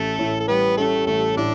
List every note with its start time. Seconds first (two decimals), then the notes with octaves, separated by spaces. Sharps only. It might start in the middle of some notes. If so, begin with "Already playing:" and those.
Already playing: A1 A3 C#4 A4
0.19 A2
0.40 A4
0.48 G3 B3 B4
0.77 A3 C#4 A4
1.07 A1 A3 A4
1.37 A2 D3 D4